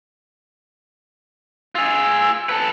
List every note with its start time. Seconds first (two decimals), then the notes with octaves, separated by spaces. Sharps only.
1.75 F4 G#4 E6
2.49 A4 B4